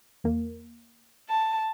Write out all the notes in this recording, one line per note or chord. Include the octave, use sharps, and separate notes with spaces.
E2 A#3
A5